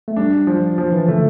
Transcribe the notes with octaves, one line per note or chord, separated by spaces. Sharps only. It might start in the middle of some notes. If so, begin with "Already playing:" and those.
A3
G3 D4
F3
F3
E3
D3 A3